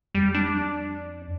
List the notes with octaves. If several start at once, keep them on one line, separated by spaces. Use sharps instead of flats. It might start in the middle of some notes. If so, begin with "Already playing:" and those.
F2 G3
D4